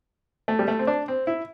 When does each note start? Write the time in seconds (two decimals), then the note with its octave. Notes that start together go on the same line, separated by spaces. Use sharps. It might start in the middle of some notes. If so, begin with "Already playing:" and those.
0.48 A3
0.59 G3
0.68 A3
0.79 C4
0.87 D4
1.08 C4
1.27 E4